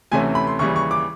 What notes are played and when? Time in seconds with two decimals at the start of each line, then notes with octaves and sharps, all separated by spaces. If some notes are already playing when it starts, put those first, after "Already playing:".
0.11 D2 C3 E3 A3 C#4 G#5
0.35 B5
0.47 C6
0.59 D#2 C#3 E3 G3 C#6
0.76 C#6
0.91 D6